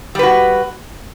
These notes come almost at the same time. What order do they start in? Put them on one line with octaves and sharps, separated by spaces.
G3 B4 F#4